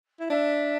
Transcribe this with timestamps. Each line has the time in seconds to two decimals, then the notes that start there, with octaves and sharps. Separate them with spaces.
0.20 E4
0.30 D4 E5